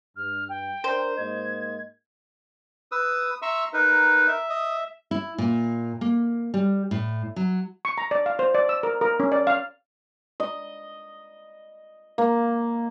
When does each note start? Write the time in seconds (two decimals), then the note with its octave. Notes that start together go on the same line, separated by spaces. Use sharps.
0.16 G2 F6
0.49 G5
0.84 D4 A#4 C5
1.17 G#2 A#3 D#5 G#6
2.92 B4 D#6 E6
3.42 E5 A#5 C6 C#6 E6
3.73 D#4 A#4 B4
4.28 E5
4.49 D#5
5.11 E4
5.38 A#2
6.01 A#3
6.54 G3
6.91 A2
7.36 F#3
7.85 C#6
7.98 A#5
8.11 D5
8.26 F5
8.39 C5
8.55 D5
8.69 E6
8.83 A#4
9.01 A#4
9.20 C#4
9.32 D5
9.47 F5
10.40 D#5
12.18 A#3